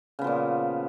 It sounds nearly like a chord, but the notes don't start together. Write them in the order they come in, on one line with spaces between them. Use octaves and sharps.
C#3 B3 F3 A#2